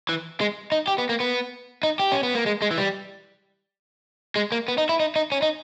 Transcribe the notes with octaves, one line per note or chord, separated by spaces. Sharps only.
E3
G#3
D#4
G4
B3
A#3
B3
D#4
G4
C#4
B3
A#3
G#3
G#3
E3
G3
G#3
A#3
B3
D#4
E4
D#4
D#4
C#4
D#4